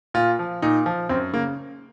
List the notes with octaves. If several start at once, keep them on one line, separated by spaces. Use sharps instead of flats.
A#2 F4
F3
A#2 D#4
F3
F#2 C4
C#3 A#3